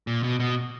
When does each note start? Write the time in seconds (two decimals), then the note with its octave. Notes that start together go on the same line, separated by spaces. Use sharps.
0.07 A#2
0.23 B2
0.40 B2